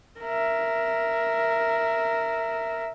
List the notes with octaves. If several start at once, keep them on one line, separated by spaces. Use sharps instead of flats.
A#4 E5